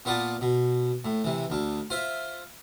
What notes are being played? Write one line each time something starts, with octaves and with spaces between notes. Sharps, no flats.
A#2 B3 F4 D5 F#5 A5
B2
A2
C3 E3
D2 D4
F4 C5 E5